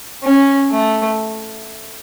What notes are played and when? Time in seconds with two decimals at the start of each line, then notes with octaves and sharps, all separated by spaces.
0.23 C#4
0.71 A3